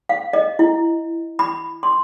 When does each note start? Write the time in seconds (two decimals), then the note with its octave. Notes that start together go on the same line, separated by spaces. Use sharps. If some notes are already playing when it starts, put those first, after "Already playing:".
0.09 F5
0.33 D#5
0.59 E4
1.39 B5
1.83 C6